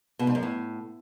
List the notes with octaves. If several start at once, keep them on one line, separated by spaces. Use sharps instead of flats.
B2
G#2
F#2
A2